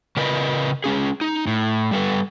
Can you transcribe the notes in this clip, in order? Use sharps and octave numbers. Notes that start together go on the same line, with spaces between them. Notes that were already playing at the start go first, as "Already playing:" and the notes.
C#3 A#4 B4 D#5
G#3 C#4 G#4
D#4
A2
G3 A4 B4